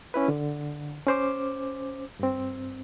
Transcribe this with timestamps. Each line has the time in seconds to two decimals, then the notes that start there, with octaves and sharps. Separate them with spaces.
0.14 C#4 E4 B4
0.28 D3
1.07 C#4 C5 D6
2.19 G2 C4